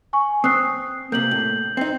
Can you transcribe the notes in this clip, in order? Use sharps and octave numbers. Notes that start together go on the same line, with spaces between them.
G#5 C#6
C4 D#6 F#6 C7
C3 A#3 G6 F#7
A2
C4 D#4